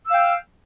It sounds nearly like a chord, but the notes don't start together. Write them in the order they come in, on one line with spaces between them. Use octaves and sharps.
E6 F5 G5